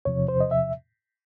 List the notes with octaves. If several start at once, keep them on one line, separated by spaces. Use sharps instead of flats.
E2 C3 F3 C#5
C5
D#5
E5